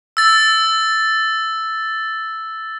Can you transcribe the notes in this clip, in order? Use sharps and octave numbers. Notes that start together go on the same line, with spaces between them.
E6 A6